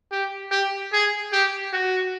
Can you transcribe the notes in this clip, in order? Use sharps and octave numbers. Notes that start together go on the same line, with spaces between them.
G4
G4
G#4
G4
F#4